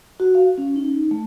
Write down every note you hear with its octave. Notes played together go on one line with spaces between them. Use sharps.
F#4
F5
C#4
D#4
A3